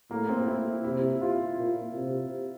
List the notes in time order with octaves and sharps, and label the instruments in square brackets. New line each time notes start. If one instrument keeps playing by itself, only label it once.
[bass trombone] A2 [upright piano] A#3
[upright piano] C4
E4
[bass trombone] C3 [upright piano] E4
[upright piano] F4
[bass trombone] A#2
C3